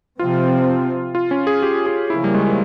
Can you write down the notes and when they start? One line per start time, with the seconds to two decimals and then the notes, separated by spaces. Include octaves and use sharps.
0.19 C3 F3 C4 F4
1.15 F4
1.31 C#4
1.47 G#4
1.63 G4
1.86 G#4
2.10 C#3 F3 A#3 C#4 E4
2.24 G3
2.34 G#3